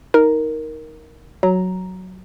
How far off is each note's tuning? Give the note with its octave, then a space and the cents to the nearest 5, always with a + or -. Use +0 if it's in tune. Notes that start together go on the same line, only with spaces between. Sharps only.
D#4 +15 A#4 +0
F#3 +0 A#5 +0